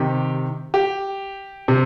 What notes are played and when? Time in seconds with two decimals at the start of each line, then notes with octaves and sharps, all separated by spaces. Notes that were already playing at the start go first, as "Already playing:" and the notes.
Already playing: C3 D#3 G4
0.74 G4
1.68 C3